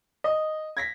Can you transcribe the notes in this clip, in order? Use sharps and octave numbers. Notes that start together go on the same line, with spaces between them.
D#5
G#6 A#6 B6